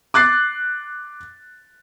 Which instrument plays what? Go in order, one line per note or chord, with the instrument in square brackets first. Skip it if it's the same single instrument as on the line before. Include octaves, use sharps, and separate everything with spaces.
[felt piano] D6 F#6 A6 C7